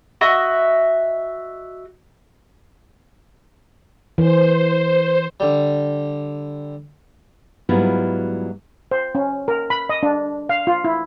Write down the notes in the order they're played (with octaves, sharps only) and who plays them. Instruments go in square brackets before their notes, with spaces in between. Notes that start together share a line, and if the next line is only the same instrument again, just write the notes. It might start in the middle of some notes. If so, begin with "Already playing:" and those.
[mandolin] F#4 D#5 E5 B5
[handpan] E3 [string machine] C5
[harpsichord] D3 G3
[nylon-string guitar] G#2 F#3 G3 B3 E4 F4
[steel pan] C5
C#4
A#4
B5
D#5
D4
F5
F4
E4